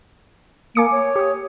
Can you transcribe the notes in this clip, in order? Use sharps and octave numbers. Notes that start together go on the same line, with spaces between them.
A#3 G#5 D6 C#7
C#5
G4 D#6